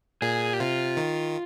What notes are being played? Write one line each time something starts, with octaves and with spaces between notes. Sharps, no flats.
A#2 G#4
G4
C3 F4
D#3